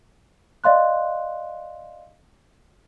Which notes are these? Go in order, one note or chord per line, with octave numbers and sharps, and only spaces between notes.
D5 D#5 F5 C6 F#6